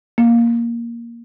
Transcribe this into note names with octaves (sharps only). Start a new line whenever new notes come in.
A#3